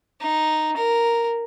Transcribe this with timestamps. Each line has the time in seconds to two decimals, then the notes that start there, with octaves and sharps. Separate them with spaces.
0.21 D#4
0.77 A#4